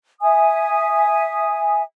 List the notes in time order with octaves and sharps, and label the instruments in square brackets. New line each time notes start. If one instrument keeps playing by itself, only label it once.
[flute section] E5 G#5 D#6